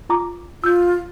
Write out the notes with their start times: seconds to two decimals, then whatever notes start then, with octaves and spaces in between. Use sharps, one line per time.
0.09 F4 A#5 D6
0.64 F4 E6 G6